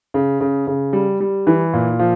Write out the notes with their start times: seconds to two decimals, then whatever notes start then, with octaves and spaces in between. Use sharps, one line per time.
0.14 C#3
0.41 C#3
0.67 C#3
0.93 G3
1.20 G3
1.47 E3
1.74 A#2
1.99 F3